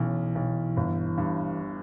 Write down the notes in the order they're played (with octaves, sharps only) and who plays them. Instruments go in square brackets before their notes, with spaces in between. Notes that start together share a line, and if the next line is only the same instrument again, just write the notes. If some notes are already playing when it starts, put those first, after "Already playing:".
Already playing: [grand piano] B1 C#4 [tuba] E3
[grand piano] B1
G1
G2